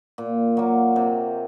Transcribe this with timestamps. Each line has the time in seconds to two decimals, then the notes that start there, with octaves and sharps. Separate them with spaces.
0.18 A#2
0.57 F#3 A#3
0.96 C3